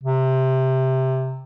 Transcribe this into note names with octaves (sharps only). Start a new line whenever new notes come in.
C3